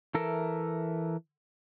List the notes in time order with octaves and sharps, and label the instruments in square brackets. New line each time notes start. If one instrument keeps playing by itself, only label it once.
[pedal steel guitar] E3 A4 A#4 E5